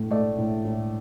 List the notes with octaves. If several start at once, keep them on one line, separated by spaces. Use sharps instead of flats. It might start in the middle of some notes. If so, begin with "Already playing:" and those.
Already playing: A2 A3
A3 D5
A2
A2